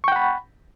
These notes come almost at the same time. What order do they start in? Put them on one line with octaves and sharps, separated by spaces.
C#6 G5 F#5 B5